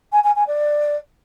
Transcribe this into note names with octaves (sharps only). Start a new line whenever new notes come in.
G#5
G#5
G#5
D5